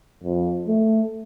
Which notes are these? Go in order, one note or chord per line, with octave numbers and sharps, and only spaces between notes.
F2
A3